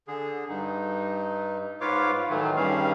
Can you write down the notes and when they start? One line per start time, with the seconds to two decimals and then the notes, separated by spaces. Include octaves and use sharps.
0.08 D3 G#4
0.49 G2 D#4
1.81 G#2 F4 B4 C#5 F5 D6
2.29 A2 D#3 E3 F#3 A3
2.57 G2 D#3 G3 C#4 G#4 F5